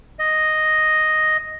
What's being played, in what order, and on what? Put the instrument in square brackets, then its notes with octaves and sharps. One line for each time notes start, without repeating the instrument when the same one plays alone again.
[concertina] D#5